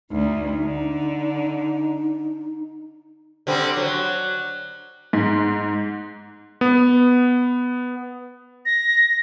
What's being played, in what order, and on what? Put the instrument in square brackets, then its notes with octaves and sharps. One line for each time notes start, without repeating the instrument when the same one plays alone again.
[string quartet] D2 [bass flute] D#4
[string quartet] D3
[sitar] D3 G3 C4
F#3
[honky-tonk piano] G#2
[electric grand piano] B3
[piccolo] A#6